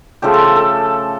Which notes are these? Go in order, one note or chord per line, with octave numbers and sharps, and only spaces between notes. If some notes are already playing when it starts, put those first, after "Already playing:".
C#3 F3 A3 G4
A4
A4
A4